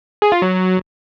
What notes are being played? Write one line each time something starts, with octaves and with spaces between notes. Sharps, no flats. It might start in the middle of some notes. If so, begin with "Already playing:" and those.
G#4
F4
F#3